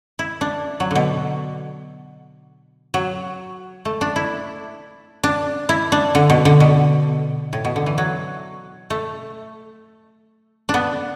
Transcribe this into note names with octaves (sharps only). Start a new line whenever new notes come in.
E4
D4
F#3
B2 D3
F#3
A3
D4
E4
D4
E4
D4
D3
B2
D3
B2
A2
B2
D3
E3
F#3
A3
D4
B3